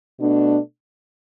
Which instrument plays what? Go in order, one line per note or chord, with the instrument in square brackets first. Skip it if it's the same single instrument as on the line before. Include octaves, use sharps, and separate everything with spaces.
[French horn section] B2 A3 D4